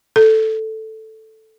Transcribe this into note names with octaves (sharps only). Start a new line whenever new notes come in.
A4